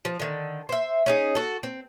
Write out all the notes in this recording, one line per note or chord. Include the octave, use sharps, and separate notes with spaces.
F3
D3 D#3
C5 E5
C#4 D#4 G#4
F#4 A4
C4